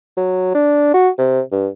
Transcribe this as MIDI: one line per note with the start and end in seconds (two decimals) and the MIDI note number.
0.17 0.54 54
0.55 0.92 62
0.94 1.09 66
1.18 1.41 48
1.52 1.68 43